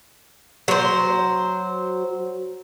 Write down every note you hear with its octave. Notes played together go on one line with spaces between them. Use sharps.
F#3 C5